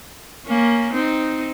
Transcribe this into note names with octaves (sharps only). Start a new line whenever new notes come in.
A#3 C#4
C4 D#4